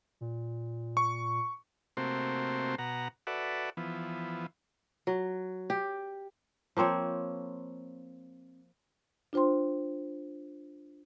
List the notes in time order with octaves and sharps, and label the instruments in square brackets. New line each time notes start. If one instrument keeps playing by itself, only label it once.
[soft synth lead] A#2
[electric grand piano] C#6
[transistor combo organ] C3 A3 A#3 C4 F#4 C5
B2 F#5 A#5
F#4 A4 B4 D5 E5 F#5
E3 F3 B3
[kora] F#3
G4
F3 A#3 C4 C#5
[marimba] D4 F4 C5 G5 C6